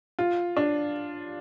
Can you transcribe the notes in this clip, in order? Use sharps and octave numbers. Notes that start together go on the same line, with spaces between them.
F4
D4